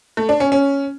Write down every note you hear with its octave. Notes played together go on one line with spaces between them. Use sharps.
A3
D4
C#4
C#4